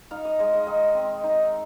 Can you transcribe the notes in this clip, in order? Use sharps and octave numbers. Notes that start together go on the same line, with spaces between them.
D#4 F5
D#5
G#3 D#5
D#5
D#3 D#5
C4
D#4